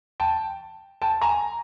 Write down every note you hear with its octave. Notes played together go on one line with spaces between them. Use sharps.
G5 A5
G5 A5
G#5 A#5